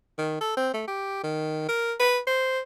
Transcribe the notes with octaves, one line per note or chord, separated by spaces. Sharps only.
D#3
A4
C4
A3
G4
D#3
A#4
B4
C5